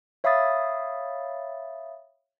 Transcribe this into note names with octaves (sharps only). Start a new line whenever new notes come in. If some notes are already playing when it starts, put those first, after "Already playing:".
C#5 E5 F5 B5 D#6 A6